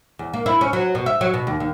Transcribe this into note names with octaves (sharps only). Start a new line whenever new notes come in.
E2
A#3
E4
C#4
F#3
B2
E5
F#3
B2
D#2
D#2